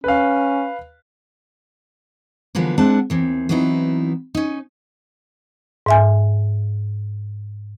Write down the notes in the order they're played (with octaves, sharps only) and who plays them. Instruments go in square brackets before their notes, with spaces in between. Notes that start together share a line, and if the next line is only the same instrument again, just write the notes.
[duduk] C#4 [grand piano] B4 F5
[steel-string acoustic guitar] D3 E3 F3 G3 A#3 B3
G#3 C4 D4 F#5 A5
D#2 E3 C4
E3 F#3 B3 C4 D#4 E4
C#4 D#4
[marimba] G#2 E5 G#5